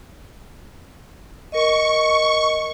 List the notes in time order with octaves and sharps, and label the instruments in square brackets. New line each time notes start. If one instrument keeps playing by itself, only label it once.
[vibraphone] A#4 D#5 [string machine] C#6